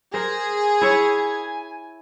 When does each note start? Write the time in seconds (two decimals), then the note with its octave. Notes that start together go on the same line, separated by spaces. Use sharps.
0.14 G#4 A#4 C5
0.81 E4 C#5 E5 G#5